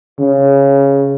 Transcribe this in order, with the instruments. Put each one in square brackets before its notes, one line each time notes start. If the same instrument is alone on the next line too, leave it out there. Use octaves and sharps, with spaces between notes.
[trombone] C#3